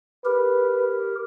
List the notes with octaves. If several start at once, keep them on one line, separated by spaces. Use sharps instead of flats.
G4 A#4 B4